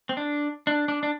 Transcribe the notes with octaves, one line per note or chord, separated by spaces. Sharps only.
C4
D4
D4
D4
D4